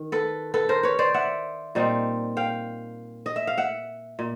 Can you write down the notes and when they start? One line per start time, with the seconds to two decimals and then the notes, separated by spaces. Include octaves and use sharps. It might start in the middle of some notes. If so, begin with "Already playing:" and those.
Already playing: D#3
0.12 A4 B4
0.54 A4 B4
0.69 A#4 C5
0.83 B4 C#5
0.99 C5 D5
1.14 E5 F#5
1.75 A#2 G3 C4 D#4
2.37 F5 G5
3.26 D#5
3.36 E5
3.47 F5
3.57 E5 F#5
4.19 A#2